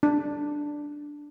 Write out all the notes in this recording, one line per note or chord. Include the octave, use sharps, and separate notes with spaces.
D4